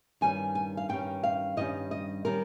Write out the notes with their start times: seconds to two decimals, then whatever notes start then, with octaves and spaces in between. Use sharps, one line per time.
0.21 G2 D#3 G3 C#4 G#5
0.55 G#5
0.77 F5
0.89 G2 D#3 G3 C#4 G5
1.23 F5
1.57 G2 D#3 G3 C#4 D#5
1.91 D#5
2.25 D#3 G3 C#4 A#4